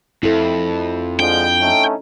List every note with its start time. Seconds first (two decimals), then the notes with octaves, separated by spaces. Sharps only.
0.23 F2 E4 A4
1.20 D3 F3 G#3 D4 G5
1.61 A3 C#4 D#4